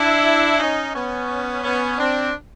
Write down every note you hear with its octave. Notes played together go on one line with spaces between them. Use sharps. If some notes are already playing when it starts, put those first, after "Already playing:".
Already playing: D4 E4
C#4 D#4
B3 C#4
B3 C#4
C4 D4